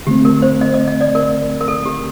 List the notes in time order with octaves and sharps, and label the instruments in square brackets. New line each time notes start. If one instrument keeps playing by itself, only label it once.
[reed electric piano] D3 A3 C4 [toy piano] G4
[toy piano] A#4
C5
D#5
D#5
D#5
D5
A#4
A#4
A4
G4